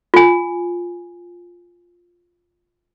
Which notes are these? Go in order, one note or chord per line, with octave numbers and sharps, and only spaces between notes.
F4 G#5